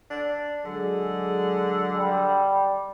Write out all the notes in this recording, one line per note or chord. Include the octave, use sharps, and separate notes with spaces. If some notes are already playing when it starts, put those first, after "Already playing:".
D4
D3 F#3 G#3 G#4
G3